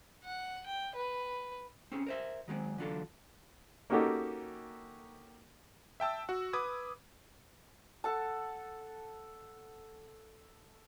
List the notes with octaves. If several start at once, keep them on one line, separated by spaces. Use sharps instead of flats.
F#5
G5
B4
C4 C#4 G#4
A#4 C5 E5
D#3 F#3 G#3 C4
D3 E3 F#3 D4 F4 A4
A#3 C#4 D#4 F#4 G4 A4
E5 G5 A5 E6
F#4 F#5
B4 D6 D#6 G#6
A4 F#5 A5